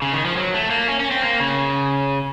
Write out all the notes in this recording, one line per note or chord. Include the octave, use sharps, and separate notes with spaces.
C#3
D#3
F3
F#3
A3
A#3
C#4
C#4
C4
A#3
C#3